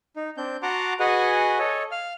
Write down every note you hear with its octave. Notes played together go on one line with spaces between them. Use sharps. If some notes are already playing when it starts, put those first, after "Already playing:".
D#4
C4 D4 G6
F#4 F#5 A5 A#5 C6 D6
F#4 G#4 B4 D#5 F#5 G#5
A4 C#5 D#5
F5 F6